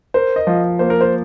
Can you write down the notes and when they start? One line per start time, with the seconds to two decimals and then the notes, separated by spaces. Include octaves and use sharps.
0.14 A#4 C5
0.36 D#5
0.47 F3
0.79 A#3 C5
0.90 A#4
1.01 C5